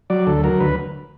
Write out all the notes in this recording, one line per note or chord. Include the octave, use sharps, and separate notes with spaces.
F#3 D5
D2 A4
F#3 A#4
D2 B4